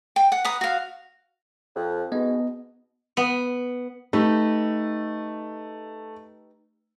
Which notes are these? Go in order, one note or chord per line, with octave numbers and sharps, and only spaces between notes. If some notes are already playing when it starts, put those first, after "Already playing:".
G5
F#5
B4 A#5 D#6
F#4 F5
F2
G#2 B2 B3 D#5
B3
A3 D#4 G4 B4